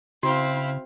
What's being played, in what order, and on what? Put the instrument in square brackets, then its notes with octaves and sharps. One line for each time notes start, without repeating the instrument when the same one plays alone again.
[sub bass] C#3 [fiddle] C4 [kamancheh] E4 F5 [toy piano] F#4